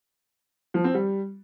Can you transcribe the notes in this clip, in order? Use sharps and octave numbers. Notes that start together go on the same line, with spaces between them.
F3
C4
G3